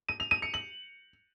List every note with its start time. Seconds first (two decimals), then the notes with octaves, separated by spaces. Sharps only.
0.09 D#7
0.20 F7
0.31 D#7
0.42 C#7
0.54 F#7